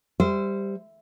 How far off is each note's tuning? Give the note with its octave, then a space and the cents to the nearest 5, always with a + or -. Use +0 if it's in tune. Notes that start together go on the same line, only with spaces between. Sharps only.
G3 +10 C5 -20 E5 +0